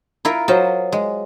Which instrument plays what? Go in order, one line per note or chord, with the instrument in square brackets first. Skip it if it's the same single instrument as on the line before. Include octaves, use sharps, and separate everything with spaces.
[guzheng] E4 F4 A#4
[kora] F#3 C5 D#5 [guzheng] F4
[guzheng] G#3